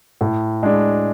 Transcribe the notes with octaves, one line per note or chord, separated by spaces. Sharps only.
A2
G#3 D4